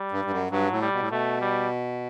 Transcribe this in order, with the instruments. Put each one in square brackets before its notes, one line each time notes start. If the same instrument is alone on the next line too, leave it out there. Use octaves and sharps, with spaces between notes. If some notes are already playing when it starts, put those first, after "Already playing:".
Already playing: [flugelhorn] G3
[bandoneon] G2
G2
F#2
[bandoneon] G2 [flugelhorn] F#3
[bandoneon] A2
[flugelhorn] G3
[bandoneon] B2
A2
[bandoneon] B2 [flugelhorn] A3
[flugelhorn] G3